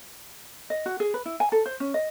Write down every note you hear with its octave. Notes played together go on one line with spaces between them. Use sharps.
D#5
F#4
G#4
B4
E4
G#5
A4
C5
C#4
D#5